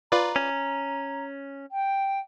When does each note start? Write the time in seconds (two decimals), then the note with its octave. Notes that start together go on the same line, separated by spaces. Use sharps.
0.12 F4 B4 D5 A#5
0.36 C#4
1.71 G5